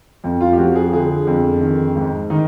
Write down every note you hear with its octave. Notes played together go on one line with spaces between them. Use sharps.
F2
F4
G4
F3 F#4
G#4
D3 G#4
F2
D#3
G#2
D#3 D#4